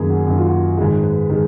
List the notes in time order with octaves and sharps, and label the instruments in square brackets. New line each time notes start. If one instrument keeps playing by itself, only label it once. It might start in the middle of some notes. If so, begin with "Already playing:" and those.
Already playing: [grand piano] F#2 D#3 A#3 G#4
F#4
F#2 D#3 A#3 F#4
F4
F#4
G#2 D#3 G#3 G#4
B4
D#3 G#3